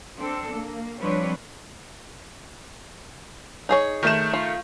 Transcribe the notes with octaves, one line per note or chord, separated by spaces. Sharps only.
C4 D4 A4
A#3
F3 G3 C4 D4 B4 C#5
D#4 G#4 C#5
D#3 A3 E7
F4